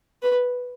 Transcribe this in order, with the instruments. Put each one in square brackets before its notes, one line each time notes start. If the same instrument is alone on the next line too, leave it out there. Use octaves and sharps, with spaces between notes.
[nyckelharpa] B4